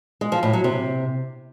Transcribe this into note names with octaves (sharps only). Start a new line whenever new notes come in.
G#3
F3
A2
F#3
C3